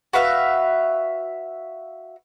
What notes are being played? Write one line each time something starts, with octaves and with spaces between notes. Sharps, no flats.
F#4 B4 E5 F5